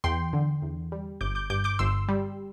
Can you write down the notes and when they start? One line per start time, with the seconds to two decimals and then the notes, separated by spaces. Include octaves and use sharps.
0.04 E2 G5 C6
0.33 D3
0.62 E2
0.92 G3
1.21 G1 D6 G6
1.35 D6 G6
1.50 G2 D6 G6
1.64 D6 G6
1.79 G1 C6 E6
2.08 G3